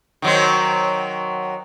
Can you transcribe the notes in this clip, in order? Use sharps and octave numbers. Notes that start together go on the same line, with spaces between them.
D#3 F#3 C4